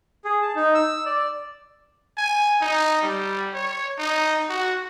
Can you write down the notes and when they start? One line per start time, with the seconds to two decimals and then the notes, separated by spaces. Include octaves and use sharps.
0.25 G#4
0.42 A5
0.55 D#4
0.74 E6
1.06 D5
2.18 G#5
2.61 D#4
3.02 G3
3.54 C#5
3.99 D#4
4.49 F#4